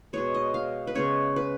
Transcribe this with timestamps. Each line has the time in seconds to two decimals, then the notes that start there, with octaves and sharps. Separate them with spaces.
0.13 B2 G#3 B3 C#5
0.34 D#5
0.54 F5
0.87 B4
0.95 C#3 G#3 B3 C#5
1.36 B4